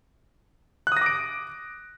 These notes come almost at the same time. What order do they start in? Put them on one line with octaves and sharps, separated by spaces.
F#6 D#6 A#6 D6 D7